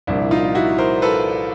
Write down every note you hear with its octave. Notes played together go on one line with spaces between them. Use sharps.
C2 A#2 F3 D4 E4
D#4 F4
E4 F#4
A#4 C5
A4 B4